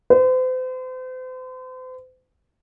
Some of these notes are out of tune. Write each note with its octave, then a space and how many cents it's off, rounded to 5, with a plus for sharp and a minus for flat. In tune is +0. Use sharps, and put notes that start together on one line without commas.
C5 -40